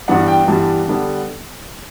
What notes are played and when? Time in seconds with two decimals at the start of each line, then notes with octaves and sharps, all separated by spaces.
0.08 G2 E3 G3 B3 D4 F#5
0.28 G5
0.47 G2 E3 G3 B3 D4 A5
0.87 D3 G3 B3 D4